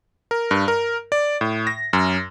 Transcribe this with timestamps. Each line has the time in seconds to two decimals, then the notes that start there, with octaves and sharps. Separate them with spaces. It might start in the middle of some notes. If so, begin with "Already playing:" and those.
0.31 A#4
0.51 G2
0.68 A#4
1.12 D5
1.41 A2
1.67 A#6
1.93 F#2